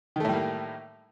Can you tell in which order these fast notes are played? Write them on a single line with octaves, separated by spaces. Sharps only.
D#3 A3 A2 G3 A#3